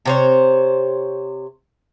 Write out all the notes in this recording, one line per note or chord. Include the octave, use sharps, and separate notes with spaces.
C3 C5 C#5